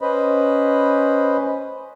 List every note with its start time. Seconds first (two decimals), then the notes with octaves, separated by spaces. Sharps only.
0.01 C#4 B4 C5 D#5 B5